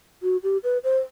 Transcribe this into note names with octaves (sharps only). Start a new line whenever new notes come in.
F#4
G4
B4
C5